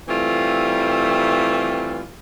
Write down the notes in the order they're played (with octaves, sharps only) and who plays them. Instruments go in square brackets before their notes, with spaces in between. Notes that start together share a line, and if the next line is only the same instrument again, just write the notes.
[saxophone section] E3 G3 A3 C4 F4